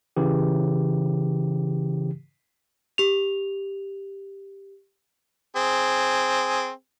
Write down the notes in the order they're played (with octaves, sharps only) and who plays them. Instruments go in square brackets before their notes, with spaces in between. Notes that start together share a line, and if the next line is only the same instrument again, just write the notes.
[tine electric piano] C#3 E3 G4
[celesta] G4 F7
[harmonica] C4 G#4